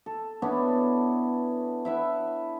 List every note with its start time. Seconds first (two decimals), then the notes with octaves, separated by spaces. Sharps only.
0.06 A4
0.42 B3 C#4 D4 E4
1.85 E4 E5 F#5